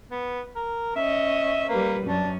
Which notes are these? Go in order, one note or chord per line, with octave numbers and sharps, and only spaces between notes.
B3
A#4
C#4 D#5 E5
G3 A#3 B4
F#2 C#4 D4